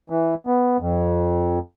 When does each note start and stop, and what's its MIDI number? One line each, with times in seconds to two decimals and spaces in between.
0.10 0.35 52
0.47 0.77 59
0.81 1.59 41